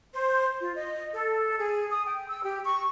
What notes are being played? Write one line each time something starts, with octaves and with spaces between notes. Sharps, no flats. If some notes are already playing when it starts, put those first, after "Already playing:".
C5
F4
D#5
A4
G#4
D#6
G5
E6
G4
C#6